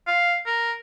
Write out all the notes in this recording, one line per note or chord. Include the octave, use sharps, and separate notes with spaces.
F5
A#4